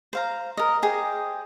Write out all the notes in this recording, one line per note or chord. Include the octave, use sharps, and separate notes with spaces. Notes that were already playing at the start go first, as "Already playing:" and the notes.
C5 F5 A#5
A#4 D#5
G4 G#4 C5 D#5